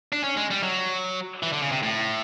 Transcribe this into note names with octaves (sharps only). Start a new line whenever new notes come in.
D4
C#4
G#3
G3
F#3
E3
D3
C#3
C3
A2